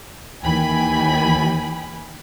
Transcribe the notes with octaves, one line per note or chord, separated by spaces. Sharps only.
D#2 E3 G5 G#5 B5